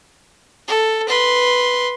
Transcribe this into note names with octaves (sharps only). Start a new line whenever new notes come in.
A4
B4 C6